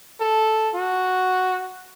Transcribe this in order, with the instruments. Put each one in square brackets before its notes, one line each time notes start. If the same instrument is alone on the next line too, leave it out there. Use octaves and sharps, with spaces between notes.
[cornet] A4
F#4